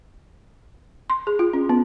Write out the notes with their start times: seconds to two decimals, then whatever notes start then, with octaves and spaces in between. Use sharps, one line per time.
1.10 C6
1.27 G#4
1.39 F4
1.53 C#4
1.69 B3